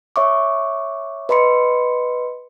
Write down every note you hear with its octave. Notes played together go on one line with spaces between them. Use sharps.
C#5 E5 C#6 D6
B4 D#5 B5 C6 C#7